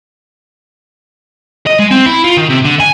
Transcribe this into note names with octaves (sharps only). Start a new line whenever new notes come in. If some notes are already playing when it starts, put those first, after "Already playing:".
D#5
G#3
C4
E4
F4
D#3
C3
D3
G#5